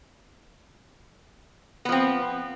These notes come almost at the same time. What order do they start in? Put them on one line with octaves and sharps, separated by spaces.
B3 F3 C4